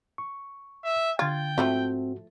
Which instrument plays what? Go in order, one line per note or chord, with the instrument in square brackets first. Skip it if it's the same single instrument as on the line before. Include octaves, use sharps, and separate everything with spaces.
[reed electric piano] C#6
[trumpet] E5
[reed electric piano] D3 G#6 A6 [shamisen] F4 [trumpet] G5
[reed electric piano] G#2 F#4 [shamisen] F3 A3 E4 [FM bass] C4